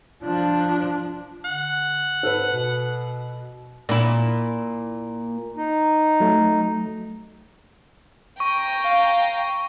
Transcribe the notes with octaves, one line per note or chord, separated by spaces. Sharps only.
F3 D4
D3 F#5
G#2 A4 B4
B2
A#2 E4
D#4
F#3 A3
G5 A#5 C#6
F5